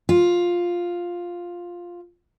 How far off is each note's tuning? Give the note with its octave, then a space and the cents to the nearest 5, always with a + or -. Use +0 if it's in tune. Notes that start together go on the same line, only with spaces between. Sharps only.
F4 +5